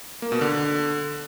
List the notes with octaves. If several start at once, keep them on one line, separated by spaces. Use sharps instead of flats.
A#3
B2
D3